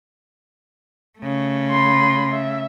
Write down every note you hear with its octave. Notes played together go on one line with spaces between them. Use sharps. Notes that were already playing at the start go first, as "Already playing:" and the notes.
C#3 A3
B5 C6
E5